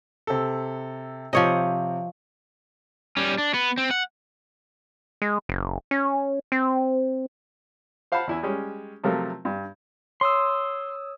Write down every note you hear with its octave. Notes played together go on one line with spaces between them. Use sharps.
C3 A4
C3 F3 C#5 D#5
G3 C#4
D4
B3
C4
F#5
G#3
F#1
C#4
C4
C5 F5 F#5 A5 B5
E2 E4 G#5
G3 G#3 C#4
C3 F3 F#3 A3 F4 A#4
G2
C#5 C6 D#6 E6